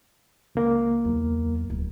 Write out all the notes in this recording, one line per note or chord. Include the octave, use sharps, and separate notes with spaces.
C#2 A#3 A#4
E2 F#3
D1